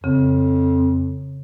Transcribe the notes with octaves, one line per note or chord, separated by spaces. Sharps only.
F2 C#3